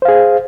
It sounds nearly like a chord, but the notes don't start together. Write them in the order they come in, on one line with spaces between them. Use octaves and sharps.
C5 F5 G#4